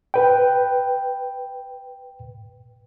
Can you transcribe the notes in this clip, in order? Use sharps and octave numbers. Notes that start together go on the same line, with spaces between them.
B4 G5